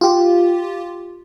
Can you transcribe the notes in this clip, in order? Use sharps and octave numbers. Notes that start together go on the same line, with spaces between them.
F4 G4